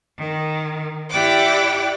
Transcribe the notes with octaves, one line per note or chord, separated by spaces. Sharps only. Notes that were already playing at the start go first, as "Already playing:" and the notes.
D#3
E4 G4 D5 F#5 G5 D6